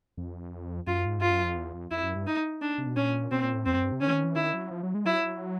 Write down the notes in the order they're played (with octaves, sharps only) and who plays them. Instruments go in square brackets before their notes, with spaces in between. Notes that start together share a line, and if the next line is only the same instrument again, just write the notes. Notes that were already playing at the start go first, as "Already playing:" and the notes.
[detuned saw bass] F2
[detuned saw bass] F#2 [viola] F4
[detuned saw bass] G#2
[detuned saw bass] G2 [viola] F4
[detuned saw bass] F#2
F2
E2
F2
[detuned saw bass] F2 [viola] E4
[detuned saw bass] F#2
G2
[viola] D#4
D4
[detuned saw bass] C3
B2
[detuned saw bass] A#2 [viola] C#4
[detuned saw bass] B2 [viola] C4
[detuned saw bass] A#2
A2
[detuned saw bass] F2 [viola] C4
[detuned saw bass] F#2
G2
C3
[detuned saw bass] D3 [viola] C#4
[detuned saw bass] E3
D#3
E3
[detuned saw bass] D#3 [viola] E4
[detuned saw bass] F#3
F3
F#3
G#3
[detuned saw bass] F#3 [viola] E4